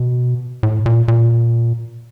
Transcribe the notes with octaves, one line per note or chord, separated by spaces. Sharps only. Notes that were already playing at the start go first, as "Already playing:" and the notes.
Already playing: B2
A2
A#2
A#2